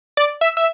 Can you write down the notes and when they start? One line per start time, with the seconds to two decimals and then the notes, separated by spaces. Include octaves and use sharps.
0.17 D5
0.41 E5
0.57 E5